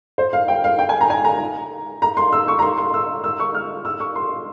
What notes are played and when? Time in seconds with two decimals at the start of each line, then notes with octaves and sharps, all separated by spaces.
0.18 C5
0.33 F5
0.48 G5
0.64 F5
0.79 G5
0.89 G#5
1.01 A#5
1.10 G#5
1.24 A#5
2.02 A#5
2.17 C6
2.32 E6
2.48 C#6
2.59 A#5
2.62 C6
2.78 C6
2.94 E6
3.24 E6
3.40 C#6
3.55 F6
3.85 E6
4.00 C#6
4.16 C6